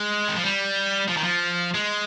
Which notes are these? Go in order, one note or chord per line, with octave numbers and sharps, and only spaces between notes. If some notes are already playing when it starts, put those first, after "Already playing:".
Already playing: G#3
D#3
F3
G3
F3
D#3
F3
G#3